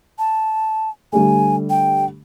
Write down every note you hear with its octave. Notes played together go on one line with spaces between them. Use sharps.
A5
D3 G3 A3 G#5
G5